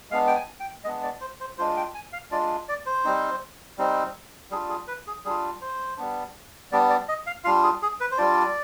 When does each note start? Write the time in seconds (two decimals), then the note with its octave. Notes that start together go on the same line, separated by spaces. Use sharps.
0.11 G#3 B3 D4 F5
0.27 G5
0.36 G#5
0.60 G5
0.84 G#3 B3 D4 D#5
1.03 D5
1.21 C5
1.40 C5
1.58 G#3 D4 F4 C5
1.77 G5
1.94 G#5
2.13 F5
2.31 G#3 D4 F4 D5
2.69 D5
2.86 C5
3.04 G3 C4 D#4
3.78 G3 C4 D#4
4.51 G3 D4 F4 G#4
4.69 G#4
4.88 B4
5.07 G#4
5.25 G3 D4 F4 G#4
5.61 C5
5.98 G3 B3 D4
6.71 G3 B3 D4 D5
6.90 D5
7.08 D#5
7.26 F5
7.44 G3 D4 F4 F5
7.63 G#4
7.82 G#4
8.00 B4
8.11 C5
8.18 G3 D4 F4 D5